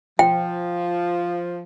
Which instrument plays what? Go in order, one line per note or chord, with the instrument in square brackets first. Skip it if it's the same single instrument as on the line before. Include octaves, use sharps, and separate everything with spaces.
[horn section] F3 [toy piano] G5